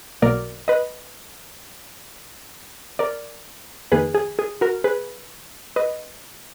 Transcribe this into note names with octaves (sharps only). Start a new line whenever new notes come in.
B1 B2 F#3 A#3 A#4 D5
B4 D#5
A#4 D5
F2 D#3 A#3 G#4 B4
G#4
G#4
F#4 A#4
G#4 B4
B4 D#5